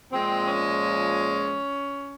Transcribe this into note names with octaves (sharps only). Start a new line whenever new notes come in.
A#2 F3 G#3 C4
C#4